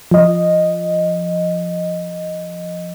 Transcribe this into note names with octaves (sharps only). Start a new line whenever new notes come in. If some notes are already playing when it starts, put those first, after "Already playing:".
F3 D#5